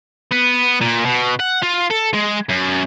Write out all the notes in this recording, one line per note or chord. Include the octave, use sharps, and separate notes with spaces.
B3
A#2
B2
F#5
F4
A4
G#3
F#2